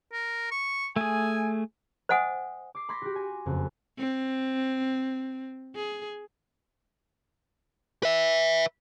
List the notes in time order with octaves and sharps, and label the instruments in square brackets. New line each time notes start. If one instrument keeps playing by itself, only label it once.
[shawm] A#4
C#6
[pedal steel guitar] A3 G#4 [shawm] G#5
[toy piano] C5 D#5 F#5 G#5 D#6
[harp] D6 C7
B5 C6 G#6 A#6 B6
F#4 G4
G#5
F#1 F2
[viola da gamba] C4
G#4
[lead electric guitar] B4 E5